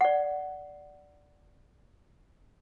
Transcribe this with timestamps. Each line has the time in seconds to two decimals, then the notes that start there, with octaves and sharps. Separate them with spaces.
0.01 D5 F#5